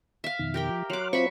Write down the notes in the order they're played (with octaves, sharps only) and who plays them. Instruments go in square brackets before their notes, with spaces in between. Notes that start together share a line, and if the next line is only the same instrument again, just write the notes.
[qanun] E5 F5
[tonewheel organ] F2 B2 D#3
[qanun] G4 A#4 G5
[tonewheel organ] F3
[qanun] F#3 D6 [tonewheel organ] C6 F6 F#6
[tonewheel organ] C4 F4 C5 [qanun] E5 B5 C#6